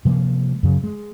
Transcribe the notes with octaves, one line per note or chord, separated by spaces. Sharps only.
C3 F3 G#3 A#3
F#2 C#3
G#3